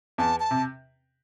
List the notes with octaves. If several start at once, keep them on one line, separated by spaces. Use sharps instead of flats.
E2 A5
A5
C3